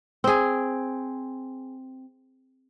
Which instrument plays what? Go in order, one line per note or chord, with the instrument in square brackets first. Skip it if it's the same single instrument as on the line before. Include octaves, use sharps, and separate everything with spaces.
[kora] C4 G#4